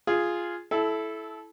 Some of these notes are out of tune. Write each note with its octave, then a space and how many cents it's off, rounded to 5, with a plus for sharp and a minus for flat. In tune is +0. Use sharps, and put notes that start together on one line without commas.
F4 -5 G#4 +0
E4 +0 A4 -20